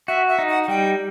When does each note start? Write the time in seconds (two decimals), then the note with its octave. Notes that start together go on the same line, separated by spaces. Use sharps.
0.08 F#4 E5
0.29 E5
0.39 D#4
0.48 F#5
0.63 F#5
0.68 G3 G5